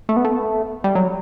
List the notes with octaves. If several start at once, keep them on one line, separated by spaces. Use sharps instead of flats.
A3
B3
A3
G3
F#3